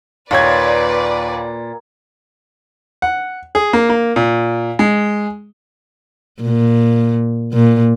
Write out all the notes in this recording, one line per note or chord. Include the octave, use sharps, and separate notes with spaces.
D#2 A#2 B4 C#5 D5 G#6
F#5
G#4
A#3
A#3
A#2
G#3
A#2
A#2